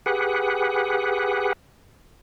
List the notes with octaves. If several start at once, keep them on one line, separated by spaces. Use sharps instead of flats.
G4 G#4 B4 F#5